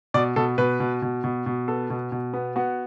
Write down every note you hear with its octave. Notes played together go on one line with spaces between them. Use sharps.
B2 D5
B2 A4
B2 B4
B2
B2
B2
B2
B3 A4
B2
B2
B3
B3 F#4